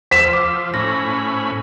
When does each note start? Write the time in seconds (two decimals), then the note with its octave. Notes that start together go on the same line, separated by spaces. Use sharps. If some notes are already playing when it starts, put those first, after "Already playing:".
0.11 F3 C5 E6 B6 E7
0.33 D6
0.74 A2 C#4 B5 A#6